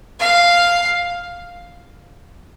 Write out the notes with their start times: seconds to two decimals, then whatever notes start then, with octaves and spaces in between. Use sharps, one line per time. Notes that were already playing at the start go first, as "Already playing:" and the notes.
0.20 F5